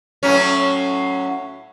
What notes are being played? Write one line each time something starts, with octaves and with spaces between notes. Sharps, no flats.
A2 F#3 C#4